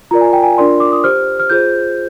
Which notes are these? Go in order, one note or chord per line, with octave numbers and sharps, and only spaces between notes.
F4 A#4 D5 A#5
G#5
G5
G#5
D4 F4 A#4 D5 C6
D6
D#6
G4 C5 F6
F6
F4 G#4 C5 G6